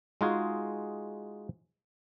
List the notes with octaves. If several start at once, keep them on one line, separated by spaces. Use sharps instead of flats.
G#3 D#4 F4 F#4 G#4